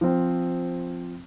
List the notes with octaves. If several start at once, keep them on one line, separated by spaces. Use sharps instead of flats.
F3 C4